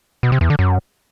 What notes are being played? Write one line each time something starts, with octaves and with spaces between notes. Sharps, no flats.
B2
C3
E2
D3
F#2